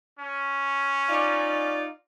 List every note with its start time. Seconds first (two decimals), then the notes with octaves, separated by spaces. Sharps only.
0.19 C#4
1.09 D#4 F4 D5